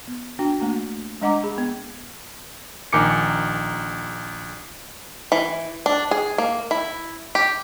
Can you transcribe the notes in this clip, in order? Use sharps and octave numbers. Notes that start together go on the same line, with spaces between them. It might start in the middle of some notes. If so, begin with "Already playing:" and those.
B3
D4 F#4 G5
A3 A#3 D4 F#4
G#3 D4 D#5 F#5 A#5 D6
G#4 B5
B3
A#1 D#3 G#5 D6 C#7
E3
D4
G#4
A#3
E4
G4